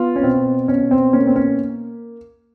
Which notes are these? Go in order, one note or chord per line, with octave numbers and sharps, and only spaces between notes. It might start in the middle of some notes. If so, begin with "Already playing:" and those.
Already playing: B3 F4
C#4
B2 C4
B2 C#4
C4
A#3 C#4
C4
C#4